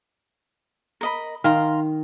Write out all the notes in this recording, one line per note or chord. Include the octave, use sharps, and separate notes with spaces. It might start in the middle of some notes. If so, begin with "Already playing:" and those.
A#4 D#5 B5
D#3 F5 A#5 C6